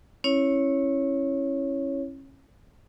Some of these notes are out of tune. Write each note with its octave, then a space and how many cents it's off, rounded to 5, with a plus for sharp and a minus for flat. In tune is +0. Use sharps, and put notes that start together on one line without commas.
C#4 -30 E4 +0 C#5 +0